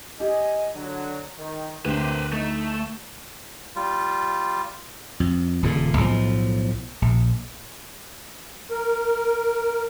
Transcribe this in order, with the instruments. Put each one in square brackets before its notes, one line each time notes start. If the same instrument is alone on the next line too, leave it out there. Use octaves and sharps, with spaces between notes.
[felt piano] G4 [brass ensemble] D#5 G#5
[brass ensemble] D3 F#3
D#3
[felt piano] D2 [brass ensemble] C3 G4 [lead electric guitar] B4 C5
[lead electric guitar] A3 [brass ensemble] D#4
[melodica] G3 F4
[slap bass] F2
D#1 A#2 C#3
B1 A2 F3
A#1
[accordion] A#4